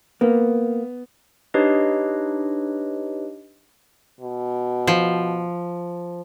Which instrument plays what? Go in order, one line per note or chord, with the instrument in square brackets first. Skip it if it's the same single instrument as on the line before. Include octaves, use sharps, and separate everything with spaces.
[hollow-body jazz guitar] A#3 [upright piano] B3
[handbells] D4 D#4 G4 B4 C#5 D#5
[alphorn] B2
[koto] F3